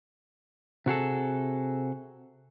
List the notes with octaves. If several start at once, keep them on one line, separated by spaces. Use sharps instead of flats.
C3 F#4 G#4 A4